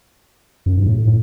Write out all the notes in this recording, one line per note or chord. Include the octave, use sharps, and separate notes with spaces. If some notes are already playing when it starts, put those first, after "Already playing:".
F#2
G2
A2
A2